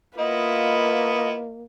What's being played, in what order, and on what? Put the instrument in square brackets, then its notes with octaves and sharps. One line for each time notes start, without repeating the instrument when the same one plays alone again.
[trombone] A#3 [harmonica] B3 E4 [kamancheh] F4 B4 [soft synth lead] D#5